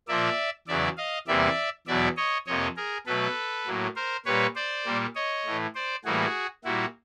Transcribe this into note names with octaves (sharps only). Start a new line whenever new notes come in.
A#2 F3 A#3 D5 E5
E2 C#3 F#3 D5 E5
D#5 F5
E2 C3 E3 G3 A#3 D5 E5
E2 B2 F#3 D5 E5
C#5 D#5
F2 C3 F3 A#3 C#5 D#5
G#4 A#4
B2 F#3 A3 A4 B4
A2 F#3 A#3
A#4 C5
A#2 G3 A#3 B4 C#5
C5 D5
A#2 G3 A#3
C#5 D#5
A2 E3 A3
C5 D5
A2 E3 G3 A#3 F#4 G#4
A#2 G3 A#3 E4 F#4